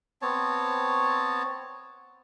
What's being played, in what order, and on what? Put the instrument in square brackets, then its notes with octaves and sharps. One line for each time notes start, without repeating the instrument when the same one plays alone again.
[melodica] B3 C4 C#5 A5